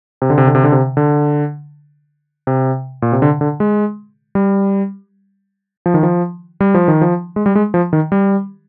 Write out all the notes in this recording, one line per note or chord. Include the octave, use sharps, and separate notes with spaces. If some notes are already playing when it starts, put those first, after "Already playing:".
C3
D3
C3
D3
C3
D3
C3
D3
C3
A#2
C3
D3
D3
G#3
G3
F3
D#3
F3
G3
F3
D#3
F3
G#3
G3
G#3
F3
D#3
G3